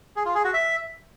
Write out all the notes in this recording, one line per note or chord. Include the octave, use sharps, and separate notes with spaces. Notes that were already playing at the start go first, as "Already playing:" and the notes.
G#4
F4
G#4
F#4
E5